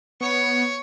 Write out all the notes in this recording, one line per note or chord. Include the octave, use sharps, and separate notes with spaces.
B3 C#5 C#6